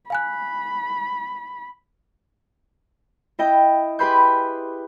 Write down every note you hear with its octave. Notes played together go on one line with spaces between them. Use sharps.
F5 G#5 B5 F#6
E4 D#5 G5
G4 G#4 B4 B5 C6 G6